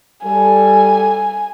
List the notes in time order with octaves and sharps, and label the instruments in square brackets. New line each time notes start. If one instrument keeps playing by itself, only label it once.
[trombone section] G3 A4 [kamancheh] G#5